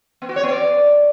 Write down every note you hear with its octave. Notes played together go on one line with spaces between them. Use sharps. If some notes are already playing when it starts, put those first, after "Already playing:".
B3
F#4
C#5
B3
D5